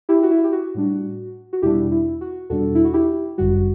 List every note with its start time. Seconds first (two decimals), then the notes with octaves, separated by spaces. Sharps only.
0.09 E4 G4
0.23 F#4
0.30 E4
0.44 G4
0.52 F#4
0.75 A2 G3 D4
1.53 F#4
1.62 E2 B2 G3 D4 E4 G4
1.92 E4
2.21 F#4
2.50 E2 B2 G3 D4 F#4 A4
2.75 E4
2.85 F#4
2.93 E4 G4
3.38 G1 F#2 D3 G3 F#4